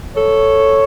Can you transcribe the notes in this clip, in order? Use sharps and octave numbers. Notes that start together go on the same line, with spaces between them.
A4 C#5